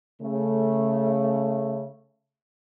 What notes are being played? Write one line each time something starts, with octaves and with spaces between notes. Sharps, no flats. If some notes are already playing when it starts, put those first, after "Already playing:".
C#3 A3